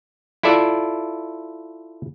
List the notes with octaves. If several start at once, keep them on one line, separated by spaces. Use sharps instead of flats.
E4 F4 A4 D5 E5